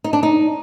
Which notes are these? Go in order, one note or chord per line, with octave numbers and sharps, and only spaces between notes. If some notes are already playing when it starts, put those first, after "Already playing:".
D#4
D4
D#4